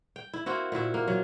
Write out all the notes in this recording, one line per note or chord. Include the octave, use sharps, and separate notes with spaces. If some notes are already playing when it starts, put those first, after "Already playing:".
G5
E4
A#3 C4 E4 F#4
A#2 E4 F#4 E5
A#3
F#3